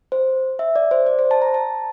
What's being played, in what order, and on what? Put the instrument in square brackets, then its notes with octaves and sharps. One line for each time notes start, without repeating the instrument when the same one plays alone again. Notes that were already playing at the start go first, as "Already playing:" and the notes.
[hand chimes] C5
E5
D5
C5
D5
C5
A5
A#5
A5